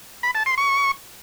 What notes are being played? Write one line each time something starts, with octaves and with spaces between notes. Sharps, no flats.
B5
A5
C6
C#6